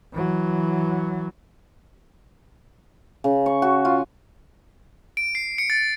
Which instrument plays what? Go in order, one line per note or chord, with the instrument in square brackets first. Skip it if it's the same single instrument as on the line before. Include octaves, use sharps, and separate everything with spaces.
[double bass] E3 F#3
[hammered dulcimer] C#3
C#6
F#4
F4
[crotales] D7
C7
C#7
A6